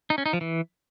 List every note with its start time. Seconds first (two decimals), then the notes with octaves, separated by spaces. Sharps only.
0.10 D#4
0.18 C#4
0.26 D#4
0.33 F3
0.41 E3